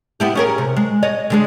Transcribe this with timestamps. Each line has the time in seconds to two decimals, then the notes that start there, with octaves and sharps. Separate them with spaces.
0.20 B3 E4 G4
0.35 C#4 G#4 A#4
0.58 C3
0.77 G#3
1.03 C#5 D#5
1.30 D3 G#3 G#4